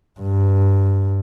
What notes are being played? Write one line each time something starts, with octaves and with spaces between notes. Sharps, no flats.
G2